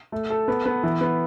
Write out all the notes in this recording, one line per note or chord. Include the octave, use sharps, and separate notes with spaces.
A3
A4
B3
B3
E3
B3